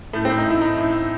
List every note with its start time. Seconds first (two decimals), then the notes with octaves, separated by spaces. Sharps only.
0.13 A2 A3
0.25 C4
0.30 A2
0.38 D#4
0.46 A2 E4
0.62 A2 D#4
0.78 A2
0.94 A2